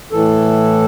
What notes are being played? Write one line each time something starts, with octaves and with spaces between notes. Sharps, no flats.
A2 E3 A4